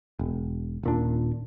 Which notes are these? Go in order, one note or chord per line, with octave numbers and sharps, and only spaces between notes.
E1
D#1 A#2 D4